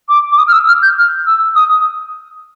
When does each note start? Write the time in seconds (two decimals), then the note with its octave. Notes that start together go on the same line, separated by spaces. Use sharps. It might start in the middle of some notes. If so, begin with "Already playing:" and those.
0.09 D6
0.32 D6
0.38 D#6
0.48 F6
0.53 E6
0.68 F6
0.82 G6
0.97 F6
1.27 E6
1.55 D#6